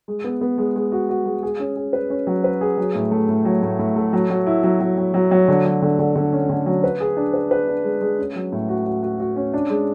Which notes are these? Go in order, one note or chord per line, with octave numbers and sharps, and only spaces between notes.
G#3
B3
B3
G#3
G#3
F#4
F#4
G#3
G#4
C#4
G#4
B4
C#4
F#3
B4
G#4
F#3
A2
A3
A2
F#3
A2
A2
A3
F#3
F#3
E4
F#3
F#3
F#3
F#3
F#3
D3
F#3
D3
D3
D3
C#4
D3
F#3
B4
G#4
D4
B4
B4
D4
G#3
G#3
C#4
F#3
A2
F#4
F#4
F#4
F#4
C#4
D4
G#3